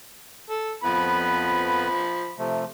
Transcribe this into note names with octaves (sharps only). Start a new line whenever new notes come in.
A4
F2 F3 B3 B4 B5
C3 F3 A3